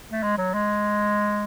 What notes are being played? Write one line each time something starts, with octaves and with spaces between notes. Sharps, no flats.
A3
G#3
F#3
G#3